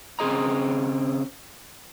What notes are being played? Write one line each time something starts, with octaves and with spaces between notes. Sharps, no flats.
C#3 C4 G#4 D#5 A#5